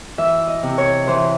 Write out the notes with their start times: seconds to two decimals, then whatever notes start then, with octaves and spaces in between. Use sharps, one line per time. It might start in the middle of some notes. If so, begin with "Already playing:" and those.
0.18 E3 E5
0.47 D#5
0.63 C3
0.78 C#5
1.08 E3 C5